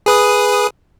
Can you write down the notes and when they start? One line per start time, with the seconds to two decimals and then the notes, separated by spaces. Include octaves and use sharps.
0.06 G#4 B4 D#6